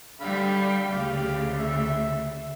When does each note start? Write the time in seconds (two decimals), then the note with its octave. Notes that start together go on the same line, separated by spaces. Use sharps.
0.21 D3 G3 G4 F5 B5
0.90 D2 C#3 G4 F5
1.59 E5